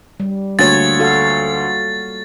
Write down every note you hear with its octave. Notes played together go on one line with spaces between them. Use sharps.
G3
D2 A#3 C#5 A6
F#4 A4 F5